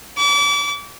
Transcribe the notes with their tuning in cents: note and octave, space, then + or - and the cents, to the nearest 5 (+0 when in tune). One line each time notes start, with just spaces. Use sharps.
D6 -35